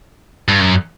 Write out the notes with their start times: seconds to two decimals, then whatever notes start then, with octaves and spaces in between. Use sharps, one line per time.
0.48 G2
0.61 F#2